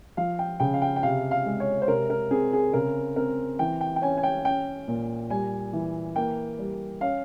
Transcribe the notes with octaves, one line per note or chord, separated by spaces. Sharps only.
F3 F5
G5
C#3 G5
F5
G5
G5
C3 F5
F5
G#3
C#5
C5
C3 A#4
A#4
C4 G#4
G#4
C#3 A#4
C4 A#4
E3 G5
G5
G5
C#4 G#5
G#5
G5
C#4 G5
A#2
G3 G#5
E3
A#3 G5
G3
C#4 F5